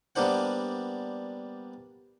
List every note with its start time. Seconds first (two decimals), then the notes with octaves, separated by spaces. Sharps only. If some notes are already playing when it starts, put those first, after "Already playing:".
0.16 G3 A#3 B3 D4 C5 F#5